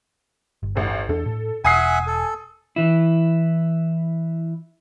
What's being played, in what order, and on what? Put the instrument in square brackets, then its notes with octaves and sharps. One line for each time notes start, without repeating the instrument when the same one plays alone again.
[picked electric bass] G1
[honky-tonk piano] A1 D2
[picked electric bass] E2 D4 [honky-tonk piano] A4
[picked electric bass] A2
[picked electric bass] E1 [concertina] E5 F#5 [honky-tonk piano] G#5 D#6 C7
[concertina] A4
[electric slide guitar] E3 E4